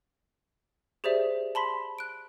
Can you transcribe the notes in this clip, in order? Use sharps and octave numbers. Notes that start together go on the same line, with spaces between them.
G4 G#4 C5 D5 E5
A5 B5 C6 B6
F#6 D7